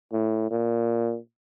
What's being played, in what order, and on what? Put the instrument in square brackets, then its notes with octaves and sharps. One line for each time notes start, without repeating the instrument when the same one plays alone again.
[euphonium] A2
A#2